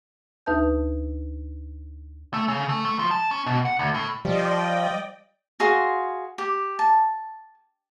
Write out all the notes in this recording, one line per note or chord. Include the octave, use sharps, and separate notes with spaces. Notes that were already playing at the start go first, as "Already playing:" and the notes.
D2 D#4 B4 E5 A5 G6
A3
C#3
A3
A3
F3
A5
C#4
B2
F#5
D2
A2
F3 G3 D5 D#5 G5
F#4 G#4 F5 C6
G4
A5